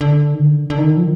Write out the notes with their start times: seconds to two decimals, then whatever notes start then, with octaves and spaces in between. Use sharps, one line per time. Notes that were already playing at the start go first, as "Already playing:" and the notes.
0.01 D3
0.34 D#3
0.39 D3
0.70 D3
0.78 D#3
0.97 F3